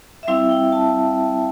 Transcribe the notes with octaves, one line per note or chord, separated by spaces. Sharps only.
E5
G3 C4 E4 F5
G5
A5